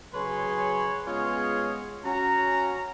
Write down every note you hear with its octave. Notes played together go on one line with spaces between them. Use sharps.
C#3 F#3 G#4 B4 C#5 C6
G#3 B3 C#4 F4 G#4 C#5
C#4 F#4 A#5